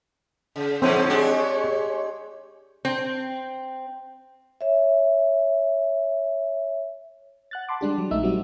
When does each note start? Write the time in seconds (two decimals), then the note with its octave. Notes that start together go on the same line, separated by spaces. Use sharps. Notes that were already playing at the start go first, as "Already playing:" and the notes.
0.56 C#3
0.82 G#2 D3 F3 C4 C5 C#5
1.10 G#3 D4 G4
2.85 C4
4.61 C#5 E5
7.51 F#5 F#6 A6
7.69 A5 B5 C6 D6
7.81 G3 G#3 D4 G4
7.98 F#3
8.11 A#1 G#3 A3 D#4 E5 E6
8.23 F#3 G3 A3 C4 F#4